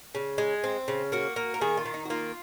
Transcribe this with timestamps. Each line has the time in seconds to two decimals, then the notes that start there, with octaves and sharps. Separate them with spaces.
0.15 C#3
0.38 G#3
0.64 C4
0.88 C#3
1.12 A#3 F#4
1.36 A#3
1.54 A#4
1.61 D#3 G#4
1.77 F4
1.85 D#3
1.94 D#4
2.05 F#4
2.10 A#3 F4